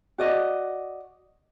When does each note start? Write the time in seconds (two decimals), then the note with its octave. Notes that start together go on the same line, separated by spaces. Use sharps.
0.18 F#4 D5 D#5